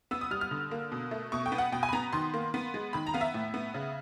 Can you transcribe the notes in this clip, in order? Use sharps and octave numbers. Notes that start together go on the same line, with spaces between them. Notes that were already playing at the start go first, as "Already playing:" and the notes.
B3 E6
D#6
G3 F6
F6
D3
A#3
B2
A3
B2 C#6
G5
B3
F#5
B2 G5
G#5
B5
B3 A#5
D#3 C6
A#3
B3
G#3
D#3 B5
A#5
B3 F5
E5
A2
B3
C#3